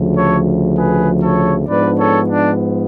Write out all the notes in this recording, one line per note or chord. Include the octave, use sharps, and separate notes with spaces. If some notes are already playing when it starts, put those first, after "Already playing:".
Already playing: D2 C#3 F3
A4 C#5
G#4 B4
A4 C#5
G#2 F3 B3 D4 B4 D5
A4 C#5
D4